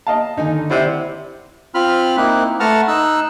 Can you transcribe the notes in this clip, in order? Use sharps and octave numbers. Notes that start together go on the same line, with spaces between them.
D#5 F5 A5
D3 D#3 D#4 G#5
C3 E4 D5 F#5
C4 F4 B5 F6
A#3 C4 D#4 E4 F#6
A3 B4 F#5 A5 A#5 F6
D#4 E6 F#6